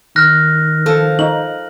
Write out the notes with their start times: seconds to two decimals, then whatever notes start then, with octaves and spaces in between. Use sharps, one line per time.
0.16 D#3 F6 F#6 A#6
0.86 F3 A4
1.19 D#4 F#7